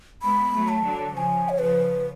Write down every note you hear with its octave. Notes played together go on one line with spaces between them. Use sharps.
G#3 B3 B5
F#3 A3
A5
D3 F#3
C#3 F3 G#5 A5
C#5
C#3 F3 B4